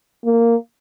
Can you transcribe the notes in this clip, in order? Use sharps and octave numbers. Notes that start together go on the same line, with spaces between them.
A#3